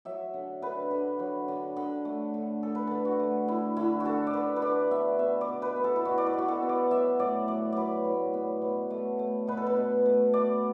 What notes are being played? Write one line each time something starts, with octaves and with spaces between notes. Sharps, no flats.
F#3 E5
D3
D3 B4
D3
F#3
D3
D3
A3
D3
D3 A4
B4
D3 A4
F#4
A3
D3 E4
D3 E4
F#4
D3 A4
D5
D3 B4
B4
D3 D5
B3 E5
B3 E5
D5
B2
B4
B3
A4
E4
B2 F#4
D5
B4
B2
F#4
A4
B3
D5
F#3 E5
A2 D5
F#3 D5
F#3 B4 D5
A2
B3
B2
A3
A3
B2 B4
A4
B4
B2
A3
B3 D5